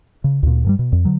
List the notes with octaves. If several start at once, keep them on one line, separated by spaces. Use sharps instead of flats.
C#3
D2 A#2
G2 F3 G3
B2
F2
D3 F#3